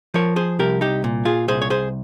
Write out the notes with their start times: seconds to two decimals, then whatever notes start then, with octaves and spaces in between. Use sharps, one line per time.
0.14 F3 A#4 C#5
0.36 G#4 C5
0.59 C2 G4 A#4
0.81 D#4 G4
1.04 A#2
1.25 F4 G#4
1.48 C2 G#4 C5
1.62 C#5
1.70 G#4 C5